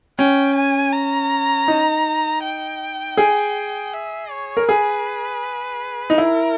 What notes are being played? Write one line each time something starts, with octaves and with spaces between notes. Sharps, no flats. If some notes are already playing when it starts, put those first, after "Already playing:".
C#4 G5
G#5
A#5
D#4
G5
G#4
E5
C#5
A#4
G#4 B4
D#4
E4 A#4